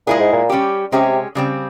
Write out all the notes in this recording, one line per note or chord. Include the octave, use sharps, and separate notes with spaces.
A#2 G#3 E4 G#4
G#2
A#2
G3 C#4 G4
C3 G#3 C#4 G4
C#3 G3 C4